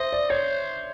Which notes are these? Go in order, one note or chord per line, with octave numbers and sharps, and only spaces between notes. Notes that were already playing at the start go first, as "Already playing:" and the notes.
Already playing: C5 D#5 E5
D5
C5 C#5